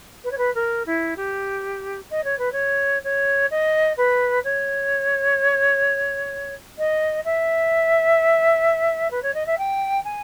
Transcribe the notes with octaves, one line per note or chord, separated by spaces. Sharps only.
B4
C#5
B4
A#4
E4
G4
D#5
C#5
B4
C#5
C#5
D#5
B4
C#5
D#5
E5
B4
C#5
D#5
E5
G5
G#5